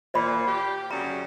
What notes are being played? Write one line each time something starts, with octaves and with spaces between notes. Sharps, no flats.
A#2 C5 D5 B5
G4
F#2 C#3 G3 A#5